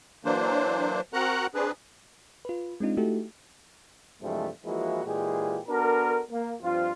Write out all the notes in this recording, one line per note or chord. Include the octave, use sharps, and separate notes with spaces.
E3 F#3 A#3 D4 C5
C4 F#4 A#4 F#5 A#5 F#6
C4 D4 G#4 B4
F4 B4
G#3 C4 D4 D#4 F4
A3 D#4 E4 F#4 G4 A4
G2 C3 E3 F3 G#3 A3
E3 F3 G#3 A#3 E4 F#4
A#2 E3 G#3 F4 G4 G#4
B3 D4 F#4 A4 A#4
A#3
G2 F3 C4 F4